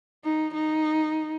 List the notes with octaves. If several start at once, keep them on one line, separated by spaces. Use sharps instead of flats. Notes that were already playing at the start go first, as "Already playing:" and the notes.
D#4
D#4